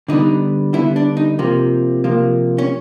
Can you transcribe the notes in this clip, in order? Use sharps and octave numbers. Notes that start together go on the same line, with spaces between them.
D3 G3 B3 D#4
D3 G3 B3 E4
D4
D#4
C3 F3 A#3
C3 F3 A#3
C#4